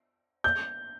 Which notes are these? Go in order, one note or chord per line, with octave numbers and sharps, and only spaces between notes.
G6